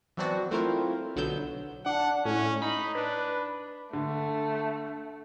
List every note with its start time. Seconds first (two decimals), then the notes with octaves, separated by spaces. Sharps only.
0.17 E3 F#3 B3 C4 D4 F#4
0.51 A3 C4 E4 F4 A#4 C5
1.16 B1 D3 F#3 B3 E6 G6
1.86 D4 F#5
2.25 A2 C#4
2.62 D#4 B5
2.95 D4 B4
3.93 D3 A3